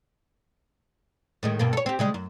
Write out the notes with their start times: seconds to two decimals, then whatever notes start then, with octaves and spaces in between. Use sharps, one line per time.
1.43 A2 D#3 G#3
1.59 G2 B2 A#3
1.73 A4 C#5
1.86 C4 G4
1.99 C#3 G3 G#3
2.14 F#2